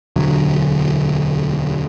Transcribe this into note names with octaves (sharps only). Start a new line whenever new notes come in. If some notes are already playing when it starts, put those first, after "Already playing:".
E1 D2 D3 F#3